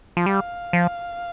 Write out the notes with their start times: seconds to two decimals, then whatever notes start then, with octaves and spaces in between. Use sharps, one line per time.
0.17 F3
0.26 G3 F5
0.73 F3